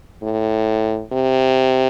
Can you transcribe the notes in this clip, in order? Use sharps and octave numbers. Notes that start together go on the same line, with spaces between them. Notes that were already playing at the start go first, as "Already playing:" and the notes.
A2
C3